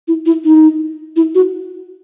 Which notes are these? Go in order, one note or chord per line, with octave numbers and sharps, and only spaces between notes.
E4
E4
D#4
E4
F#4